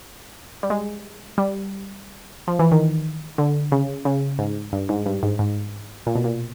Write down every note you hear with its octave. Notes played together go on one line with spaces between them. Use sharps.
G3
G#3
G3
F3
E3
D#3
D3
C#3
C#3
G#2
G2
G#2
G2
G#2
G#2
A#2
B2
A#2